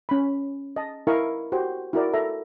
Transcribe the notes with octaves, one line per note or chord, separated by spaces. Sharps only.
C#4 B5
D#5 A5
E4 A#4 D#5 F5 C#6
F#4 G4 C5
E4 F#4 A#4 D5
A4 E5 A#5